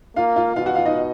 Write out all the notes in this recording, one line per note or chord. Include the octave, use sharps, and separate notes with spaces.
A#3 F4 F5
F4 F5
B2 F4 F5
F#4 F#5
F4 F5
D#4 D#5